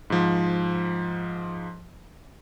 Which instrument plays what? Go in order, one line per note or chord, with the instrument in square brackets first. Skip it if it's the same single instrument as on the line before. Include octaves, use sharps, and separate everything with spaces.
[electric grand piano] G#2 F3